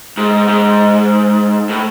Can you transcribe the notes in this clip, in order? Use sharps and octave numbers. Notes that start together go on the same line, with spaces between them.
G#2
G#2
A2